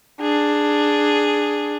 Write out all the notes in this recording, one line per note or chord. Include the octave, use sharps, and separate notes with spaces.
D4 G#4